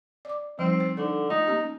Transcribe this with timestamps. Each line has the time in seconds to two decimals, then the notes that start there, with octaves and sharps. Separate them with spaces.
0.25 D5 D6
0.59 F3 G3 C4 D#4
0.80 C5
0.97 D3 D#4 A4
1.30 A3 D#4 F4
1.47 A#3 C#4 G4